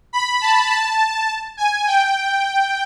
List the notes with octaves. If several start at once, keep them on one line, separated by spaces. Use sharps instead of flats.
B5
A5
A5
G#5
G5